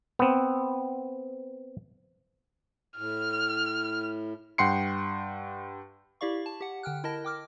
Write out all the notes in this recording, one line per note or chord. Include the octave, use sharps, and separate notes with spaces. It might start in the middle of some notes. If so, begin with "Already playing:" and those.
B3 C4
A2 F6
G2 F#5 G5 C6 C7 C#7
E4 G4 D5 F5 C#6
A5
G4 F#5
D3 G5 F6 F#6
E4 A#4 D#5 A5 A#6
G5 D6 F6